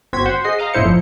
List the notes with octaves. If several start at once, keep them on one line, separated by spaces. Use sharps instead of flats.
G1 C4 F#4 C5 G#6 B6
C5 F#5
G#4 D#5 C7
D#5 F5 A#5
G1 A2 E4 C5 C#7
F3